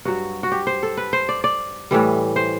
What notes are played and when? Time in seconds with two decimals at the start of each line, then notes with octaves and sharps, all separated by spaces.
0.05 G2 F#3 F#4
0.43 F#4
0.52 G4
0.67 C5
0.83 A4
0.97 B4
1.13 C5
1.29 D5
1.44 D5
1.91 A2 E3 G3
2.36 C5